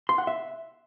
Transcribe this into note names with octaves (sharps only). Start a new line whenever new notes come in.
C6
F#5
E5